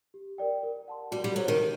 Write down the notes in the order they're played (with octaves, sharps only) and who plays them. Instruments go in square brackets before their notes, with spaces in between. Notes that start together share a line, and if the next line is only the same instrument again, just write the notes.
[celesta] G4
A#4 D5 G5
A#4
F#5 A5 C6
[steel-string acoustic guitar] G3 [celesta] F#4
[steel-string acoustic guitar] G3
[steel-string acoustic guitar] F#3 [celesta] A4 C5
[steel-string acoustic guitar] D#3
[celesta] A4